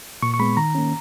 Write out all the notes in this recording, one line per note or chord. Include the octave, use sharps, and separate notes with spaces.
A#2 C#6
C#6
G#3 B3 B5
D#3 A#5
A#3 C#4